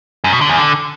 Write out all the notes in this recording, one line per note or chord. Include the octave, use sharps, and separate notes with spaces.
F#2
B2
D3
E2
D3